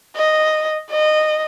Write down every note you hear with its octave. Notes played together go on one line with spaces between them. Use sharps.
D#5
D#5